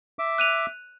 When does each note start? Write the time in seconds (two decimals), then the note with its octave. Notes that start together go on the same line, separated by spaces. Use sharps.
0.19 E5 D6
0.38 F#6 D#7 F7